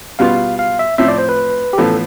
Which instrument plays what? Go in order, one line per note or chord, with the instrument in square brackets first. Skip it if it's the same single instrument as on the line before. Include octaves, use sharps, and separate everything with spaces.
[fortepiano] B2 G3 B3 F4 [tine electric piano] F5
[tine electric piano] F5
E5
[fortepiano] A2 F3 C4 [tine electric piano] E5
[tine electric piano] D5
C5
B4
G4
[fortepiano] A1 A2 F3 B3 [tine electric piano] A4